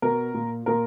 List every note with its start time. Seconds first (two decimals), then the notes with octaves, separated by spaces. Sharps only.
0.02 B2 A#4
0.34 A#2
0.66 A#2 A#4